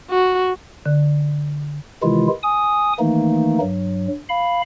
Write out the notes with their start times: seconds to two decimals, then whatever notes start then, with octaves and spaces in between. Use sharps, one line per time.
0.10 F#4
0.86 D3
2.03 C3 D#3 E3 G#3 E4 F4
2.43 G#5 D#6
2.99 D#3 E3 A3 A#3 D#4
3.61 G2 F#3
4.29 F5 B5